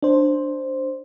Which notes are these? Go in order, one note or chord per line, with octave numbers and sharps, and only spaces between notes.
D4 C5